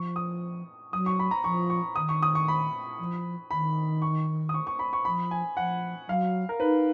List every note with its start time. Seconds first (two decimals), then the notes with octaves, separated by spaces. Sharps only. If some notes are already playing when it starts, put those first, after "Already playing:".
Already playing: F3 C#6
0.16 D#6
0.92 F#3 D#6
1.06 C#6
1.19 B5
1.31 A#5
1.44 F3 C#6
1.70 C#6
1.96 D#3 D#6
2.09 C#6
2.23 D#6
2.35 C#6
2.48 B5
2.99 F3
3.51 D#3 B5
4.02 C#6
4.49 D#6
4.54 C#6
4.67 C#6
4.79 B5
4.93 C#6
5.05 F3 B5
5.31 G#5
5.57 F3 F#5
6.08 F#3 F5
6.49 A#4
6.60 D#4 B4